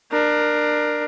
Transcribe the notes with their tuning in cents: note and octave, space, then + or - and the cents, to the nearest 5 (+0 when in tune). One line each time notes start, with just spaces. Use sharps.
D4 +25 A#4 +10